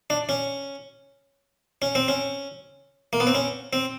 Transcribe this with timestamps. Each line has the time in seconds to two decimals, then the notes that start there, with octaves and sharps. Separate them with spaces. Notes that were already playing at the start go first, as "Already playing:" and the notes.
0.10 D4
0.29 C#4
1.82 C#4
1.95 C4
2.08 C#4
3.13 A#3
3.20 B3
3.27 C4
3.35 C#4
3.73 C4